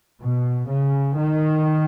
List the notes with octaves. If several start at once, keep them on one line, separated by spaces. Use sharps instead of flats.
B2
C#3
D#3